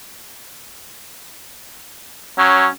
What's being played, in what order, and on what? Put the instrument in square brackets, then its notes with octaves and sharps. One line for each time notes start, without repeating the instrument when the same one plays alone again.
[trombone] F#3 [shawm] C#4